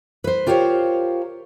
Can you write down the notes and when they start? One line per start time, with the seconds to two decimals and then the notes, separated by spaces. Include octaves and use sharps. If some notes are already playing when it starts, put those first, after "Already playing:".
0.24 B4 C5
0.47 F4 G4 A#4 C5 C#5 F5